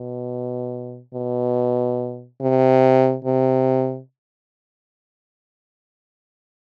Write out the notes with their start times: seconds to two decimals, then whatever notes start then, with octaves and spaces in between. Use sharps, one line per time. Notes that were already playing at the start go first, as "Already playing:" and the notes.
Already playing: B2
1.14 B2
2.41 C3
3.25 C3